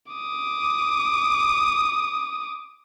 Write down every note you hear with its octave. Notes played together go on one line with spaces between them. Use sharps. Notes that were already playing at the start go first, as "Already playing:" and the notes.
D6 D#6